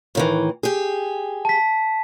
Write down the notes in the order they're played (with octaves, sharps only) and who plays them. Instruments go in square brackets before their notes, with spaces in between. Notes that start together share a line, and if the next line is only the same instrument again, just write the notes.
[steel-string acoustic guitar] A2 D#3 E3
G4 G#4
[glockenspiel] A5 B6